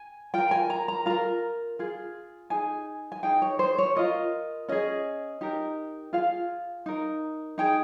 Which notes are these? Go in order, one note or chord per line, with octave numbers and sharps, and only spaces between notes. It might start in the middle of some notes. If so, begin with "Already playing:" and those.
Already playing: G#5
F4 A#4 G5
G#5
A#5
A#5
F4 A#4 A#5
F4 G#4
D#4 G#4 G#5
G#5
D#4 G#4 G5
C#5
C5
C#5
F4 A#4 D#5
C#4 G#4 D#5
D#4 G4 A#4
F4 G#4 F5
D#4 A#4
D#4 G#4 G5